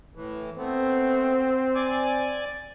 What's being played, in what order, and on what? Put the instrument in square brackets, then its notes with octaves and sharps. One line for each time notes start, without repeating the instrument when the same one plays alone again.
[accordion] A2 E3
[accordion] A3 B3 [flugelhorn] C4
[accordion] D5 G#5 D6